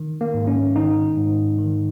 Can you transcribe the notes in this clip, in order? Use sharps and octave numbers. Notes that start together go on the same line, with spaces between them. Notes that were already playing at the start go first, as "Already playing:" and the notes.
Already playing: D#3
A#3
G#2
C#4
D#3 D#4
G#2
D#3